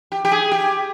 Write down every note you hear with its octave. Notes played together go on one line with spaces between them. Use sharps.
G4
G4
G#4
G4